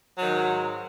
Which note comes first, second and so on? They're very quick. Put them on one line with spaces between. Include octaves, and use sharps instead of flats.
F#3 D#3 G#2